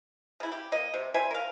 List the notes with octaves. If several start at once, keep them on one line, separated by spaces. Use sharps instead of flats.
C#3 E4
G4
A#3 D#5
C3
G3 C5 E5 G#5
A#4 F5